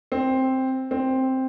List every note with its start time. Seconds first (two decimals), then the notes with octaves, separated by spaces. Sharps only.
0.12 C4
0.91 C4